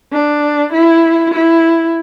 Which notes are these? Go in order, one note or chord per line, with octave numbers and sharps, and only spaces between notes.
D4
E4
E4